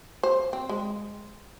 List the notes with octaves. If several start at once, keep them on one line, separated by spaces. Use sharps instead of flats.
C5
C4
G#3